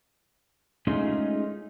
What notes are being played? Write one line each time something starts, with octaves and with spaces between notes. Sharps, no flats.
G#3 A3 C#4 D#4 F4 G#4